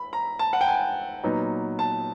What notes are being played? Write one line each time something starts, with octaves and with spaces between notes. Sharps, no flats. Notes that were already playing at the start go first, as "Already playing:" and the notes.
Already playing: B5
A#5
A5
F#5
G5
G#5
A#2 F#3 B3 D#4
A5